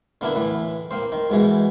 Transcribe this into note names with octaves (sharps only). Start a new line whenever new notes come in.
D3 A#3 B3 D4 E4
A2 E3
A#3 C4 C5
D#3
G#2 B2 E3 G#3